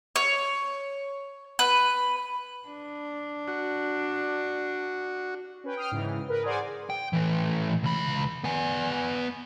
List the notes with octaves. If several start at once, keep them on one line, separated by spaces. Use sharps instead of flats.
C#5
B4
D4
F#4
C#4 B4 G5
G5 D#6 F6 C7
G#2 C#3 E3
A#4 B4
G#4 A#4 C5 D5 F#5 G#5
G5
A2 E3
C#2 B5
B3 G#5